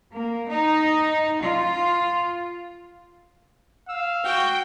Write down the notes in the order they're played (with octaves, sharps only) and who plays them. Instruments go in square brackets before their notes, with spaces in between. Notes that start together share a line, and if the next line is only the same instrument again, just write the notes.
[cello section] A#3
D#4
F4
[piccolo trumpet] F5 [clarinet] E6
[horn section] F#4 [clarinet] F#5 [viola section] G5